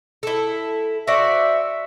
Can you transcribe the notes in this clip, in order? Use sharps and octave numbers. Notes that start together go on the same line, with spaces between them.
E4 A4
F#4 C5 D5 E5